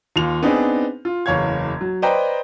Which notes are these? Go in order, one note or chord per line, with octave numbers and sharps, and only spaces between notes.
D#2 F4 F7
B3 C4 D4 D#4 G#4
F4
F#1 E2 C#5 F5 G#6
F#3
B4 C5 D5 D#5 G5 A#5